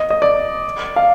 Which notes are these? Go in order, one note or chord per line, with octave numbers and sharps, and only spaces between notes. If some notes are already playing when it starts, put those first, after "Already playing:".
Already playing: D#5
D#5
D5
F5